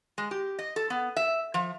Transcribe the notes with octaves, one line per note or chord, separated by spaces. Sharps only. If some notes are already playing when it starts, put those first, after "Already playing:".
G#3
G4
D#5
A4
B3
E5
F3